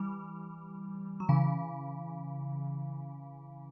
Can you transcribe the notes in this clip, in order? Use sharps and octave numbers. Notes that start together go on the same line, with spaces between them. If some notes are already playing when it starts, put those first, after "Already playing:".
Already playing: E3 G3
F#3
C#3 E3